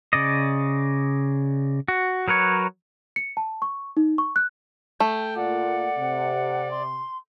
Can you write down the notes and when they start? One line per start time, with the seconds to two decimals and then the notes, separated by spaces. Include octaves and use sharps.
0.13 C#3 D5 D#5
1.88 F#4
2.28 F#3 A#4 B4 C#5
3.16 C#7
3.37 A5
3.62 C#6
3.97 D#4
4.18 C#6
4.36 F#6
5.00 A3 G5
5.36 A#2 A#3 F4 D5 F#5
5.98 C3
6.71 C6